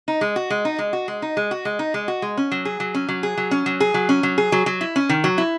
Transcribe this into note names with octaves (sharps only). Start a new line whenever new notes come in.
D#4
G#3
F#4
G#3
D#4
G#3
F#4
G#3
D#4
G#3
F#4
G#3
D#4
G#3
F#4
G#3
C#4
F#3
G#4
F#3
C#4
F#3
G#4
F#3
C#4
F#3
G#4
F#3
C#4
F#3
G#4
F#3
F#3
E4
C#4
D#3
F#3
E4